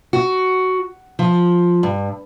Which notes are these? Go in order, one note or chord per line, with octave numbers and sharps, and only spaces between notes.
F#4
F3
G2